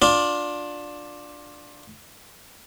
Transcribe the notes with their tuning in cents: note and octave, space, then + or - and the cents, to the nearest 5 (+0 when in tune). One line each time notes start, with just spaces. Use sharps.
D4 +0 F4 +25 D5 +0